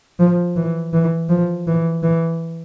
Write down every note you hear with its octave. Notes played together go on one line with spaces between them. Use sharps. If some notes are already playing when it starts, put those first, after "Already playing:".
F3
E3
E3
F3
E3
E3